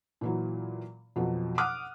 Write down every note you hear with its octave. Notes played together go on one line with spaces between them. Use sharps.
A#2 E3 F#3
F2 B2 F3 F#3
F#5 D6 D#6 F6 F#6